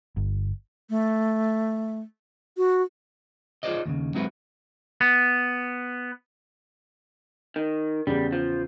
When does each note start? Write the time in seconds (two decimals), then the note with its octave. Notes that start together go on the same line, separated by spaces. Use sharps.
0.17 G1
0.90 A3
2.57 F#4
3.63 F4 G#4 B4 C5 D5 D#5
3.86 D#2 A#2 C#3
4.15 F#3 G#3 C4 E4 F#4 B4
5.01 B3
7.56 D#3
8.07 E2 C#3 G3
8.33 F3